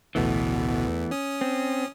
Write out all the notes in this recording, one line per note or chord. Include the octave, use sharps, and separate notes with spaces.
A1 D2 B2 E3 A3 B3
E2
C#4 D#6
C4